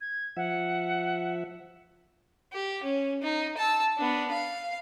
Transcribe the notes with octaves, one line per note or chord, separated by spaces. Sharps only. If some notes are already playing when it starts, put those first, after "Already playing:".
G#6
F3 E5 F#5
G4
C#4
D#4
A5 E6
B3 D4
F5